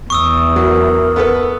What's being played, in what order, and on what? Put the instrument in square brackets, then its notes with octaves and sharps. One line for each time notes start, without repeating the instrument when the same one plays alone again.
[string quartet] E2 [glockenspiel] C#6 D#6 E6
[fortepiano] F#3 [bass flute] A#4
[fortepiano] B3 A4 B4